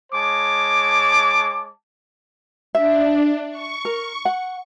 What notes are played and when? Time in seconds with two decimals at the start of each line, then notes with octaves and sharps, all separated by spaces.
0.13 G#3 C#5 A5 D6
2.75 D4 E5
3.50 C#6
3.85 A#4
4.25 F#5